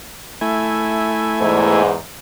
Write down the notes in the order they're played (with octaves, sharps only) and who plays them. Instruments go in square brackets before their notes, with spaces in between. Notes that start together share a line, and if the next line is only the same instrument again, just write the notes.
[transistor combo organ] A3 E4 G#5
[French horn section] E2 G#2